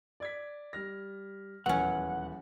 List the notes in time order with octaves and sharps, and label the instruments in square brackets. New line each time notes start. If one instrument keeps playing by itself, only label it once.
[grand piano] D5 G#6 B6
G3 F6 A#6
[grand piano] D#1 E2 B4 [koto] F#3 C#4 [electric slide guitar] F#5